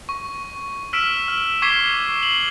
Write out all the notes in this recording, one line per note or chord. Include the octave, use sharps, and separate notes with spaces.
C#6
E6 F6 B6 D7 E7
F6
C#6 D6 G#6 B6 C7 G7
F#7